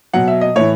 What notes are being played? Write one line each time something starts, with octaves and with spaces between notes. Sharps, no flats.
B2 F#3 F#5
E5
D#5
A2 E3 C#5